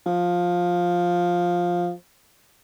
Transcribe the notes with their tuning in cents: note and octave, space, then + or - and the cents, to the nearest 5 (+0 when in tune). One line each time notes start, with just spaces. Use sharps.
F3 +10